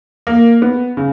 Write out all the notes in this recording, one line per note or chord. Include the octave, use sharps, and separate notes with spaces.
A#3
B3
C#3